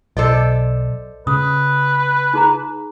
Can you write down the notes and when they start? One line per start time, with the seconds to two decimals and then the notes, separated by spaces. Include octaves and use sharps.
0.17 B1 A4 C5 D5 D#5
1.27 C#3 B4 D#6
2.34 D#4 G#4 A#5